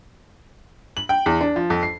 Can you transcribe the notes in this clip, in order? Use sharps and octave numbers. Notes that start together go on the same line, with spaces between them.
F#7
G5
E2
D4
F3
F2
C7